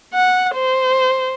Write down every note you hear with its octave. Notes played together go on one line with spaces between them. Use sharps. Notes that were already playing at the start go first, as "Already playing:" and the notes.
F#5
C5